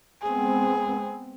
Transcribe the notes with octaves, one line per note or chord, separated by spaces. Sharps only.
G#3 B3 C4 G#4